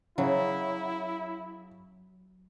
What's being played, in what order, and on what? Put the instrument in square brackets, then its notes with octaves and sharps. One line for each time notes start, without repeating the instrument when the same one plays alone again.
[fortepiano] C#3 [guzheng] F#3 [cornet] E4